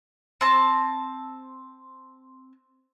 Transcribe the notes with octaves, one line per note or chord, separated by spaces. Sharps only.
C4 A5